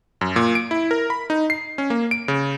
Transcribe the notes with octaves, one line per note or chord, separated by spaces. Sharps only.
F#2
A#2
D7
E4
A#4
B5
D#4
C7
C#4
A#3
D7
C#3